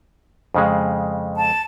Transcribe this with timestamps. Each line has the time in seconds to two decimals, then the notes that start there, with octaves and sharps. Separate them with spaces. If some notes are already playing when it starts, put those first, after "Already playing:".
0.55 F2 C#3 G#3
1.37 A5